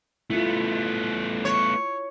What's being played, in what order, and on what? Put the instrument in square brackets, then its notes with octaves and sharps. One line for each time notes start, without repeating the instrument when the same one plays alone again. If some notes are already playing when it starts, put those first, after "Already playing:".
[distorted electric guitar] A3 B3 [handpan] E4 F4
[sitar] C#5